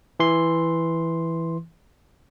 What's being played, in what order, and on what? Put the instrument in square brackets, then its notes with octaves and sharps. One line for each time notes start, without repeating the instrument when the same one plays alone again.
[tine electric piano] E3 C6